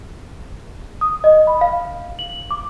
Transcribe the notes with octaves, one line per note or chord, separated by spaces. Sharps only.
D#6
D#5
B5
F5
F#7
D6